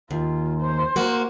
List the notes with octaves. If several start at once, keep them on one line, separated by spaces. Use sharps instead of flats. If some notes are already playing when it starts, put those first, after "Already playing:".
D#2 F4
C5
A#3 F#4